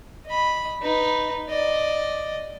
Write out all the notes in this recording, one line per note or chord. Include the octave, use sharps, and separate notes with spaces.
D#5 B5
D#4 B4
D5 D#5